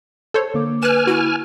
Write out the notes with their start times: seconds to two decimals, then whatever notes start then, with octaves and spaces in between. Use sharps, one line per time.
0.34 A4 C5 C#5
0.54 D3 A#3 D6
0.83 B4 G#5 F6 F#6 E7
1.07 E4 F#4